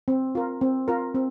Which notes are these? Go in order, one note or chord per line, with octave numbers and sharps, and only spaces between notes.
C4
F4 A#4
C4
F4 A#4
C4